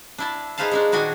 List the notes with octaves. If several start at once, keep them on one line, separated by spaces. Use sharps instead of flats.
D4 E4 A5
D#4 G#4 B4 C5 F5 A5
G#3 D4 D#4
A#2 D#3 D4 F#4 D#5 G#5